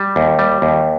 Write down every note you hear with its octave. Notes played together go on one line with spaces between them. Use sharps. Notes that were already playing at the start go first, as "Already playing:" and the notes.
Already playing: G3
D#2
G3
D#2